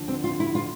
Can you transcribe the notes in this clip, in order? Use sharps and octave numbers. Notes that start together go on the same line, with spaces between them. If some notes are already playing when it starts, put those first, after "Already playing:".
Already playing: D2 D3 F3
C4
F4
E4
F4